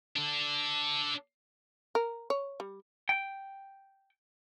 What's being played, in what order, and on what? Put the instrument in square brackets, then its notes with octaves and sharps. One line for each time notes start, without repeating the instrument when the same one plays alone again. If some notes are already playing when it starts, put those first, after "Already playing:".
[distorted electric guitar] D4 A4
[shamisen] A#4
C#5
G3
[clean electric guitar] G5